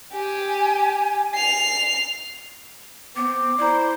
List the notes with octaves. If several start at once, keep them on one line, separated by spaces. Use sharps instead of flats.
G4 G#5
C7 F7
B3 C4 D6
E4 C5 D5 A#5